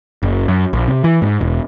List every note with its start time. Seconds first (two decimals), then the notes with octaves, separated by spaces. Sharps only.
0.23 F#1
0.48 F#2
0.73 A#1
0.88 C3
1.04 E3
1.22 G#2
1.41 E1